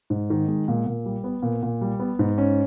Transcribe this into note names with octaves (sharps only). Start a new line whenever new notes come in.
G#2
D#3
G#3
A#2
A#2
G3
B3
A#2
A#2
G3
B3
G#2
C#4